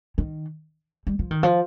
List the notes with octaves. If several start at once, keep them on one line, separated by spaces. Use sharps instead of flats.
D#3
G3
F3
D#3
F3